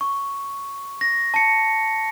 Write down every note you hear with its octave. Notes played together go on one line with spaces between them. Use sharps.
C#6
A#6
A5 C#7